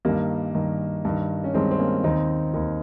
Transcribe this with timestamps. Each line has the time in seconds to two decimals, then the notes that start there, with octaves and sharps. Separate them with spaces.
0.05 G2 D#3 G3 A#3
0.55 G2 D#3
1.05 G2 D#3
1.44 C#4
1.54 G2 D#3 G#3 C4
1.71 C4
1.79 A#3 C#4
2.04 D#2 D#3 C4 D#4
2.54 D#2 D#3